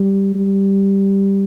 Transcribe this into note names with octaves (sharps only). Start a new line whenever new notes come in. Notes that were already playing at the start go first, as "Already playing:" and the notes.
Already playing: G3
G3